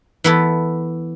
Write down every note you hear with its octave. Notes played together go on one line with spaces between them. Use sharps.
E3 B3 A4